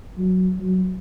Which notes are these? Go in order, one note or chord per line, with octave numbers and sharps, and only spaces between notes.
F#3
F#3